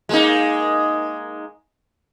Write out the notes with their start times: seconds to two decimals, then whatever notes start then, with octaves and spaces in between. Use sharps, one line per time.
0.09 G#3 A#3 D#4